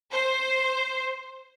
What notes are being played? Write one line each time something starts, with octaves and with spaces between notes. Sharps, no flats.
C5